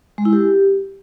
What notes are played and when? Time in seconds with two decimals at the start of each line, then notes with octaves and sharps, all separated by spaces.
0.18 G#3
0.25 E4
0.33 G4